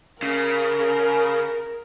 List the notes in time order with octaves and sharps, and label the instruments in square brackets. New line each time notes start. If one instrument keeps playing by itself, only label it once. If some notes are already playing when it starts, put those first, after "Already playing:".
[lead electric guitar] C#3 [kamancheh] A#4